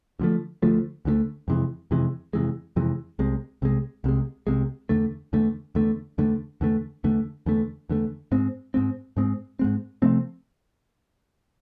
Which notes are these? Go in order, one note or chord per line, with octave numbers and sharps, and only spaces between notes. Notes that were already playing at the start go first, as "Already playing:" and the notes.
D2 D3 F3 A3
D2 D3 F3 A3
D2 D3 F3 A3
F2 C3 E3 G#3
F2 C3 E3 G#3
F2 C3 E3 G#3
F2 C3 E3 G#3
C2 C3 G#3
C2 C3 G#3
C2 C3 G#3
C2 C3 G#3
E2 D3 A3
E2 D3 A3
E2 D3 A3
E2 D3 A3
E2 D3 A3
E2 D3 A3
E2 D3 A3
E2 D3 A3
G#2 G#3 C4
G#2 G#3 C4
G#2 G#3 C4
G#2 G#3 C4
C3 F3 A3 C4